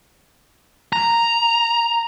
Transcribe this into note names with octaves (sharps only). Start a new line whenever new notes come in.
A#5